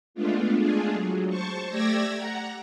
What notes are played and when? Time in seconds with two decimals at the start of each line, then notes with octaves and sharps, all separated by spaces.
0.14 G#3 A3 B3 D4 F4
0.58 G#3 A3 D4 F4 G#4
0.92 F#3
1.28 C5 A5 C#6
1.69 A3 G4 D5 E6 G#6 A#6
2.14 F#5 A#5